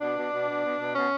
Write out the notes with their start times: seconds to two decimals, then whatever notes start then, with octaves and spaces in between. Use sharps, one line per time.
0.01 B2 D4
0.16 B2
0.32 B2
0.48 B2
0.64 B2
0.79 B2
0.95 B2 C#4